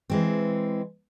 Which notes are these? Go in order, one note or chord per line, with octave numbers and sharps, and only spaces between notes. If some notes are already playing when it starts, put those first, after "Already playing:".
E3 G#3 C4